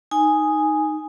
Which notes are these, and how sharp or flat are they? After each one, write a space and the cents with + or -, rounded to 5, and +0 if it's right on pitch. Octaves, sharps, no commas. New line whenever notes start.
D#4 +0 G#5 +0